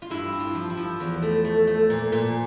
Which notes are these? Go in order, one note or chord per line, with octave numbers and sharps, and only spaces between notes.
F4
G2 E4
C4
F4
F3
E4
F3
E2
A3
A3
A3
A#2
A#2